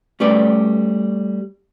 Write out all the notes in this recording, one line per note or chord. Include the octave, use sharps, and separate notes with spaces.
G3 A3 C#4 B4 D5